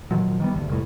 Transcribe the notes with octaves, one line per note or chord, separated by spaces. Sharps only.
A#2 D#3 F3 F#3
D#3 G3 B3
G1 D2
F1 C2 A2